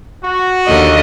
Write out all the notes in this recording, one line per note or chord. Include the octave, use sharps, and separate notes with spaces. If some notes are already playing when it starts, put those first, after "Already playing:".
F#4
D#2 D3 D#5